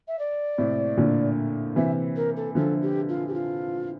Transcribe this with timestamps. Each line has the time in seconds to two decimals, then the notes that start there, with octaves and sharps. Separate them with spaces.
0.08 E5
0.19 D5
0.58 A2 C3
0.97 A#2 D3
1.76 C3 E3 E5
2.16 A#4
2.36 A4
2.55 D3 F3 A4
2.82 G4
3.09 F4
3.28 G4
3.34 F4